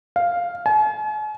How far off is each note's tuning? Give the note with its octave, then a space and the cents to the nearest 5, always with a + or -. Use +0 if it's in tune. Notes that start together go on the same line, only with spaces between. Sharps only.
F5 +0
G#5 +45